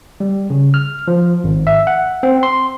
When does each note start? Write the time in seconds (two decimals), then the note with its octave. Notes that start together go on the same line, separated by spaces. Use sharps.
0.20 G3
0.50 C#3
0.74 F6
1.08 F3
1.44 G#1
1.67 E5
1.87 F#5
2.23 C4
2.43 C6